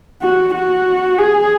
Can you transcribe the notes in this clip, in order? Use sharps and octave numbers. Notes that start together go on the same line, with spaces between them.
F#4
F#4
G#4